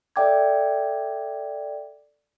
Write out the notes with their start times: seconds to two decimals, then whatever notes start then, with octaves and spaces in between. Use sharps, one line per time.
0.16 A4 D5 E5 G5 D6 G#6